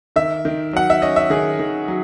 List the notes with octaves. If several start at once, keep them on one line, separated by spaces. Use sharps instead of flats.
D#3 E5
D#3
F#3 F#5
E5
C#4 D#5
E5
D#3 G#4
D#3
F#3